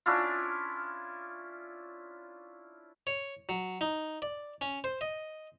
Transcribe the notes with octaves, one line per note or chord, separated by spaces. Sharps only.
C#4 D4 E4 F4
C#5
F#3
D#4
D5
C#4
C5
D#5